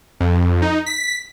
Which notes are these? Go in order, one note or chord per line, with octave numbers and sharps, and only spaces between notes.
F2
D#4
B6